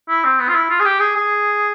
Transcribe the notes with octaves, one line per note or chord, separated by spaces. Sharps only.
E4
C4
B3
F4
E4
F4
G#4
G4
G#4
G#4